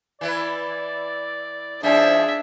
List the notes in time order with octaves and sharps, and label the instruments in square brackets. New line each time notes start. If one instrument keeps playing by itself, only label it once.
[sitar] E3 E4 B4 [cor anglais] D5
[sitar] G#2 F3 C#4 [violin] D4 [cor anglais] G#4 [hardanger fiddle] E5